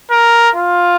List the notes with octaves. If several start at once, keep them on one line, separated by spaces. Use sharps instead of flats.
A#4
F4